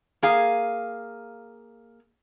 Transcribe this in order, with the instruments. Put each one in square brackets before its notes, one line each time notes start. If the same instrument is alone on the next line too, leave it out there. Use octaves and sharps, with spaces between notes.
[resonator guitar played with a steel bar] A#3 G#4 F5